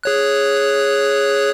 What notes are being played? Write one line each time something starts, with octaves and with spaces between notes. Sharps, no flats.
G#4 C#5 F#6